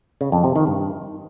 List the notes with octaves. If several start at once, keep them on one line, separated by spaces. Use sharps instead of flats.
C#3
F2
C3
D#3
G2